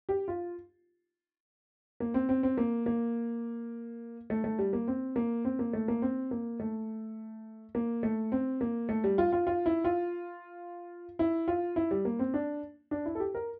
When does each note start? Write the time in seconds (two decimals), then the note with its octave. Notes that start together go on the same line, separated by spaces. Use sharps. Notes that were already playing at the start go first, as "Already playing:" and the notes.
0.09 G4
0.28 F4
2.00 A#3
2.14 C4
2.29 C4
2.43 C4
2.57 A#3
2.86 A#3
4.30 A3
4.44 A3
4.59 G3
4.73 A#3
4.88 C4
5.16 A#3
5.45 C4
5.59 A#3
5.73 A3
5.88 A#3
6.02 C4
6.31 A#3
6.60 A3
7.75 A#3
8.03 A3
8.32 C4
8.61 A#3
8.89 A3
9.04 G3
9.18 F4
9.32 F4
9.47 F4
9.66 E4
9.84 F4
11.19 E4
11.48 F4
11.76 E4
11.91 G3
12.05 A#3
12.19 C4
12.34 D4
12.91 D4
13.06 E4
13.15 A4
13.20 G4
13.35 A#4